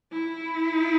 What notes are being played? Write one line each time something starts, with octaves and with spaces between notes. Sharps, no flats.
E4